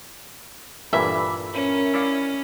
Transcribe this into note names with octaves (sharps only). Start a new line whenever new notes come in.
G2 A#2 E3 A4 E5 B5 D6
C#4 A#4 B5
E4 D5 F5